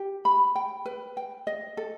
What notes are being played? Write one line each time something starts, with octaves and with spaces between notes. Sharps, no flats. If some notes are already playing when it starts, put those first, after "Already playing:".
Already playing: G4
B5
G5
B4
G5
D#5
A4